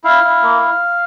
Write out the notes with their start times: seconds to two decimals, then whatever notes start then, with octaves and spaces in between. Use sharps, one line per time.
0.04 E4 F5
0.24 E4
0.43 A#3